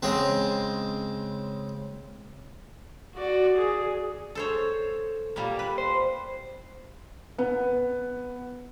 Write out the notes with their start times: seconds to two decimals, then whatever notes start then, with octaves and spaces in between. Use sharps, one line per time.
0.03 C#3 G#3 C4
3.15 F#4 D5
3.56 G#4
4.35 A4 C5 C#5
5.36 A#2 G3 A#3
5.59 B4
5.78 C5
7.38 B3